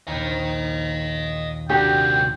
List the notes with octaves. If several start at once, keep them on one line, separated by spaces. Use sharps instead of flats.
A#1 D#2 D#5 G5
C3 D4 F#4 G4 A#4 G5